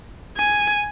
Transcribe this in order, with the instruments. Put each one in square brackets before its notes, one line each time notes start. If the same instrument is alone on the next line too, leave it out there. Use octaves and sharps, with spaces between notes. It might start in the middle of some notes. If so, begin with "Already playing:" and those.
[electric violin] G#5